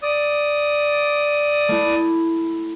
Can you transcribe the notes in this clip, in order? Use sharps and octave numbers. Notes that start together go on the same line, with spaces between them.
D5 D#6
A3 E4